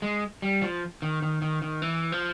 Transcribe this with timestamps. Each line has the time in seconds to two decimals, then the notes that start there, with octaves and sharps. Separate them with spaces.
0.02 G#3
0.42 G3
0.62 F3
1.02 D#3
1.22 D#3
1.42 D#3
1.62 D#3
1.82 E3
2.12 F3